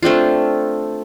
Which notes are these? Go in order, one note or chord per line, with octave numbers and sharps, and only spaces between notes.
A3 C4 D4 F4